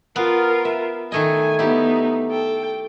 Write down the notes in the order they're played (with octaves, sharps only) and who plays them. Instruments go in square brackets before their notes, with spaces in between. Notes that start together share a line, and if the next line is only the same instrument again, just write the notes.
[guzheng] B3 [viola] F4 A#4
[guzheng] E5
[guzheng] D#3 A3 D#5 [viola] G#5
[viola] B3 D#4 [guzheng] E4 G4
[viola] A4 G5